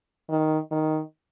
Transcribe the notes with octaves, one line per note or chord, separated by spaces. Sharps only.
D#3
D#3